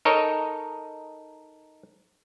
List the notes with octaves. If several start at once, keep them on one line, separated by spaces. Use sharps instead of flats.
D#4 A4 A#4 C#5 D#5